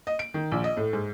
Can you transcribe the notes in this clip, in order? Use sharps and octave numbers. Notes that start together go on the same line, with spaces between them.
D#5
D7
D#3
A#1
D#5
A2
G#2